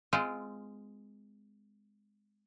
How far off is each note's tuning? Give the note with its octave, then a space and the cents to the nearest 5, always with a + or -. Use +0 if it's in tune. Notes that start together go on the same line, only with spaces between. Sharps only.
G#3 +0 C4 -30 F4 -10